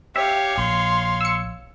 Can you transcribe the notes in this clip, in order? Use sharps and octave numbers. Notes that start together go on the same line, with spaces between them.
G4 C#5 E5 F5
A#1 C6
E6 C#7